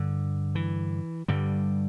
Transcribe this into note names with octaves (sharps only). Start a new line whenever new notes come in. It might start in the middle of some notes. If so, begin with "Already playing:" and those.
Already playing: G2 D3
E3
G2 D3 G3